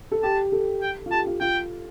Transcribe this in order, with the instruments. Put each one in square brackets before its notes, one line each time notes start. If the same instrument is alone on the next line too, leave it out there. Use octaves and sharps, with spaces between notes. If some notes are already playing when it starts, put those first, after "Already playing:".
[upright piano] A4
[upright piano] G4 [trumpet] A5
[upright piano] A4
[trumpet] G5
[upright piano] F4
[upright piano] G4 [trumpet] A5
[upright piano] F4
[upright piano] F4 [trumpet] G5